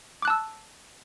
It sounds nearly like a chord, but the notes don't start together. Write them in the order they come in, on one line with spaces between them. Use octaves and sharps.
D6 F#6 A5 E6